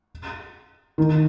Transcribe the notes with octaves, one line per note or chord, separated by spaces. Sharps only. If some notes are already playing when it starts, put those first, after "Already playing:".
D#3